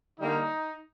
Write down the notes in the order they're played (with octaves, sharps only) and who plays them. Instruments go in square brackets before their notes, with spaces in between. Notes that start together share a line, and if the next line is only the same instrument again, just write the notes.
[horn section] D3 G3 A#3 D#4